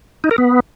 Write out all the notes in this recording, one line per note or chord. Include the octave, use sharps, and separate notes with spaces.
D#4
A#4
B3